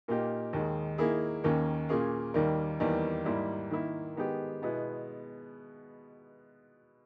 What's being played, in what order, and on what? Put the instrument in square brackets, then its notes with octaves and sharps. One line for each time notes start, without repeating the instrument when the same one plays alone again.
[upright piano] A#2 A#3 D#4 G4
D#2 D#3 G#3
D#3 A#3 E4 G#4
D#2 D#3 A#3 C#4
A#2 A#3 C#4 G#4
D#2 D#3 G3 A#3
E2 D#3 G3 A#3
G#2 G3 A#3 E4
D#3 A#3 E4
D#3 G#3 B3 G4
B2 G#3 B3 E4